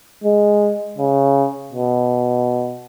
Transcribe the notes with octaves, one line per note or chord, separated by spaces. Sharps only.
G#3
C#3
B2